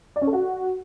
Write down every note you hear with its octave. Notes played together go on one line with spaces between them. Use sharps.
D5
C#4
A4
F#4